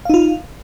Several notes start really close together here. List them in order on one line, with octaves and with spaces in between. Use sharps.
F5 D#4 F4